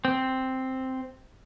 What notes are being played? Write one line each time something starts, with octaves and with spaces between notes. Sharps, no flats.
C4